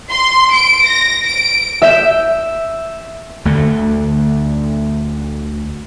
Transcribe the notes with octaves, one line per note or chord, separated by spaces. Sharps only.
C6
D7
A#6
D7
E5 G6 E7
D2 D3 A3